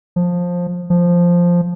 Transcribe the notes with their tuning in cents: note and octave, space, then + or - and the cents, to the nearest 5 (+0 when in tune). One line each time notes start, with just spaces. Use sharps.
F3 +15
F3 +0